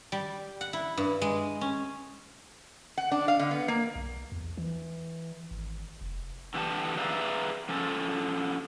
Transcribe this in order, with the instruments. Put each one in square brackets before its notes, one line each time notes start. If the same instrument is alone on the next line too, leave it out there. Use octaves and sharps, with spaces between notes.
[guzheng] G3
F#5
E4
G2
G#3
C#4
[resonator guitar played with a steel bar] F#5
D4
F5
D3
B3
A#3
[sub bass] B1
E2
E3
G#1
F1
[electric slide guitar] D3 E3 G4 E5 A5
G#4 B4 D5 E5 F5 A#5
F3 C#4 A4